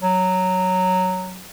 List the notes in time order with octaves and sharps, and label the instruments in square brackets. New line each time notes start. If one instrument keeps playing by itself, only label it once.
[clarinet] F#3